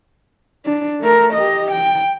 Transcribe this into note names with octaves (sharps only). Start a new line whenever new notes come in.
D4
A3 A#4
G4 D#5
G5